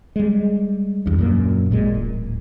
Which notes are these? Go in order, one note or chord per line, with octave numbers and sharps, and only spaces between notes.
G3 G#3
E2 G2
F#2 A#2 A#3
A1 A#2 G#3
D1